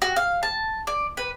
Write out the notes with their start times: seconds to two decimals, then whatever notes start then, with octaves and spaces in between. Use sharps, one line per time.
0.02 F#4
0.16 F5
0.43 A5
0.87 D5
1.17 B4